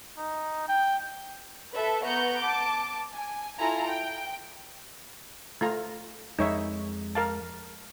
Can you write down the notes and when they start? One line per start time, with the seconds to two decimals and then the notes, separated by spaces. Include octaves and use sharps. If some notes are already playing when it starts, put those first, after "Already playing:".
0.17 D#4
0.68 G5
1.74 A4 B4 E5
2.02 B3 A#5 C#6 G6
2.42 A5 D6
3.14 G#5
3.59 E4 F4 A4 G#5 A#5
3.87 G5
5.61 A3 F4 A#5
6.39 F2 G#3 D#4 C#5 E5
7.15 A#4 F5 A5